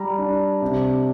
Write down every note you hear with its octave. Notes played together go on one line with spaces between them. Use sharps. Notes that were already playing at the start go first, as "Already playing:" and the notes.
Already playing: G3 A#5
D4
C3